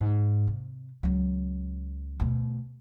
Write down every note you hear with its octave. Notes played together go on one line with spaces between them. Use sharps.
G#2
C3
C#2 F#3
D2 B2